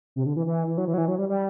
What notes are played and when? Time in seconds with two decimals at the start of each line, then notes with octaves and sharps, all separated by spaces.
0.16 C3
0.26 D3
0.36 E3
0.47 E3
0.67 E3
0.77 F#3
0.87 E3
0.94 F#3
0.98 E3
1.08 F#3
1.18 G3
1.29 G3